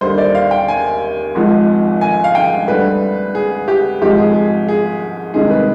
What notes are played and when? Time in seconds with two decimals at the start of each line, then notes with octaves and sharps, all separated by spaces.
0.01 D#2 D3 G3 C5
0.18 D5
0.35 F5
0.51 G5
0.68 G#5
1.35 G#1 G#2 F3 G#3
2.01 G#5
2.24 F5
2.35 G5
2.67 D2 D3 G3 B4
3.35 G#4
3.68 G4
4.01 G#1 G#2 F3 G#3 G4
4.18 G#4
4.34 G#4
4.68 G#4
5.34 C2 C3 D#3 G#3 G#4
5.51 B4